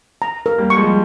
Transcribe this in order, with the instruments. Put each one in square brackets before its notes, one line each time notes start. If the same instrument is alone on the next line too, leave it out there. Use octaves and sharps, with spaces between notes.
[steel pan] A#5
A#4
[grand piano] G3 A#3
[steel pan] C#6
[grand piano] F3 G#3
G3